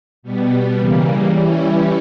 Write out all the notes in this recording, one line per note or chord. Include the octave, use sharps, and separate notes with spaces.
B2 G3 B3
C#3 E3 G3 A#3
E3 G3 C#4 E4